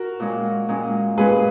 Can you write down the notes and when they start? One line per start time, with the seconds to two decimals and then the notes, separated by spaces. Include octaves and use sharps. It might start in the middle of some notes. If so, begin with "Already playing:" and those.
Already playing: F#4 A#4
0.20 A#2 G#3 C#4
0.68 A#2 G#3 C#4
1.17 A#2 G#3 C#4 G#4 B4